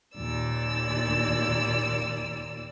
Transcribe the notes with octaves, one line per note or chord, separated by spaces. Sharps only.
D#2 A#2 D5 E6